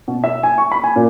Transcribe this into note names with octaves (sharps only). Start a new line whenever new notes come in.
B2
E5
G#5
C#6
B5
G#5
A#2